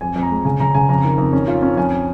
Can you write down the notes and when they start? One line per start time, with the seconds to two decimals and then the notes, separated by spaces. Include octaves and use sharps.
0.01 F2 G#5
0.16 F2
0.23 A#5
0.31 G#3
0.45 C#3 G#5
0.60 C#3 A#5
0.74 C#3 G#5
0.89 F2 A#5
1.04 D#3
1.18 F2
1.33 C#4
1.48 F4
1.62 C#4
1.77 F2 G#5